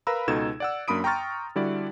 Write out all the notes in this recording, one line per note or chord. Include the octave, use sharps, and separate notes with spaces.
A#4 B4 F5 A#5 B5 E6
C#2 B2 D#4 A4 G#6 E7
D5 F#5 E6
F#2 A#3 D4 B5 D#6 D7
G5 A#5 C6 C#6 F6 A6
D3 G3 E4 F#4 D5